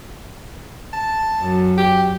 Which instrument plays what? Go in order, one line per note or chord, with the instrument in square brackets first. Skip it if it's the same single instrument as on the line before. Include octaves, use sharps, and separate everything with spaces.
[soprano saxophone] A5
[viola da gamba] F#2
[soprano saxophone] G4